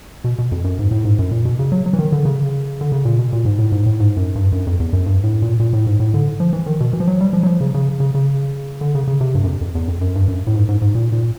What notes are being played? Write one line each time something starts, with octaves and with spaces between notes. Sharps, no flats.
B2
B2
F2
F#2
G#2
A2
G#2
F#2
A#2
B2
C#3
F#3
F#3
E3
D#3
D3
C#3
D3
C#3
A#2
B2
A#2
G#2
A2
G#2
A2
G#2
F#2
G2
F#2
F2
E2
F#2
G2
A2
A#2
A#2
A2
G#2
A2
D3
F3
E3
D#3
B2
E3
F3
F#3
G3
F3
F#3
F3
C#3
C#3
C#3
C#3
D3
C#3
C#3
C3
G2
F#2
F2
F2
E2
F2
F#2
G2
F#2
A2
G#2
G#2
G#2
A#2
A#2